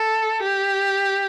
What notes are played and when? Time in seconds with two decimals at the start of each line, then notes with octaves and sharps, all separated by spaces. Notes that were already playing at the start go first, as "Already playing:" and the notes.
Already playing: A4
0.43 G4